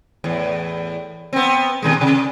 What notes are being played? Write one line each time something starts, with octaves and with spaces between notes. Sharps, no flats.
E2 A2
B3 C4
B2 D#3 G#3
C3